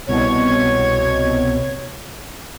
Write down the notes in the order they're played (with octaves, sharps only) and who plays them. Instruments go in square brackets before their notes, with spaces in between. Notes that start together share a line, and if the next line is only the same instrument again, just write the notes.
[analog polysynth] C2 B2 [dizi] C#5